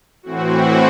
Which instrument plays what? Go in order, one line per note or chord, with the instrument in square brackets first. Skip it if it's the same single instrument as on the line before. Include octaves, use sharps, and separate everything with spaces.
[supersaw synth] A2 E3 C4 F#4